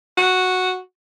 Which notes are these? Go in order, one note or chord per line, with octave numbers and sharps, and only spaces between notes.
F#4